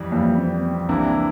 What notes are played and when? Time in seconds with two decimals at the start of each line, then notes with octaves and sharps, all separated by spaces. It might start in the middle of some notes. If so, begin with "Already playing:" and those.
Already playing: F2 E3 G3
0.11 F2 E3 G3 A#3
0.38 C4
0.63 C4
0.89 C2 C3 E3 A#3 D4 E4